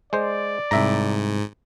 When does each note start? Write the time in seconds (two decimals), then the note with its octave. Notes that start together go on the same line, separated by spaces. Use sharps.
0.13 G#3 C5 D5
0.71 C2 G#2 E5 A#5